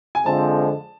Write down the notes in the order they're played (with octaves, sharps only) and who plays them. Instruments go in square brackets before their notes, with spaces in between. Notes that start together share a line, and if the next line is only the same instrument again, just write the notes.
[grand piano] G#5
[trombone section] F2 D3 F3 G#3 C4 [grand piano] A5